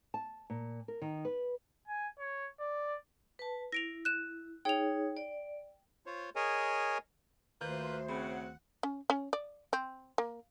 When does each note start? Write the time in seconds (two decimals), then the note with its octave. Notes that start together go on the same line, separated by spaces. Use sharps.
0.14 A5
0.50 A#2
0.88 A#4
1.02 D#3
1.25 B4
1.88 G#5
2.19 C#5
2.60 D5
3.39 B4 A5
3.72 E4 A#6 D7 F7
4.05 F#6 D#7 E7
4.65 D#4 G#4 C#5 G5 F7
5.17 D5
6.06 F4 C5 C#5
6.36 G#4 A#4 C#5 D#5 G#5
7.61 D2 D#3 A#3 F4 B4 C5
8.09 C#3 C4 F#5 B5
8.83 C#4
9.10 C#4
9.33 D5
9.73 C4
10.18 A#3